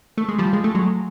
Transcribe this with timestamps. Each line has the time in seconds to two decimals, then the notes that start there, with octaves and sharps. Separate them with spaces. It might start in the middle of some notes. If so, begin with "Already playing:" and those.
0.18 A3
0.29 G#3
0.38 F3 G3
0.53 G#3
0.64 A3
0.75 F#3 G#3